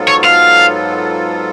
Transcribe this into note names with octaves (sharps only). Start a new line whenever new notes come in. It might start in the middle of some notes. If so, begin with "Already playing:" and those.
Already playing: G#2 F#3 B3 F4 A4
C#5
F5